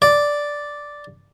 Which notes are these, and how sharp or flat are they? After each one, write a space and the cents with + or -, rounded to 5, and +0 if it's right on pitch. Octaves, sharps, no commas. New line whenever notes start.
D5 -5